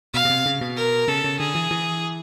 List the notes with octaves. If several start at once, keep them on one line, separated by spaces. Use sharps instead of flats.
B2 F5
B2
C3
C#3
B2
A#4
C#3 A4
C#3
D3 G#4
E3
E3